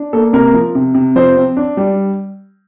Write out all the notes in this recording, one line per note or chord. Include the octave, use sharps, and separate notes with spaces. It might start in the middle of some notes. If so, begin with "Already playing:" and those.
Already playing: D4
A#3 A4
C3 A#4
F3
C3
C3
F3 C5
C4
D4
G3